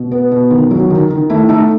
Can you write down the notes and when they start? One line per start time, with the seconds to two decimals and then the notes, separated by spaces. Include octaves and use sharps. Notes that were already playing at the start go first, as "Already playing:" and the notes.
Already playing: B2
0.12 B3
0.32 B2
0.50 D#3
0.71 F#3
0.90 D#3
1.10 D#3
1.30 A3 E4
1.49 A3 D#4